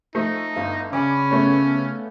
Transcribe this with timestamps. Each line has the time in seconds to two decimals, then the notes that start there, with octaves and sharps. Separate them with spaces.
0.15 F3 A3 D#4
0.56 G1 F5 A5 A#5
0.93 C#3 C#4 D5 G#5 B5 D6
1.31 A3 B3 C#5